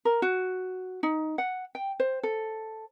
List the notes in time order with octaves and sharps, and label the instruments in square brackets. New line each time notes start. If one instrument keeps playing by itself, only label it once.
[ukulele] A#4
F#4
D#4
F#5
G5
C5
A4